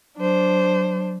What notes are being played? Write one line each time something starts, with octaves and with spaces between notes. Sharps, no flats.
F#3 D4 C5